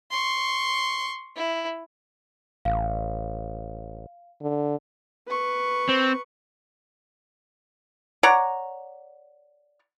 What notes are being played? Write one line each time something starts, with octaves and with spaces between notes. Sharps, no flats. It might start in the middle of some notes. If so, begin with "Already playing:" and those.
C6 C#6
E4
A1 F5
D3
B4 C#6
C4
C#5 D5 F#5 A#5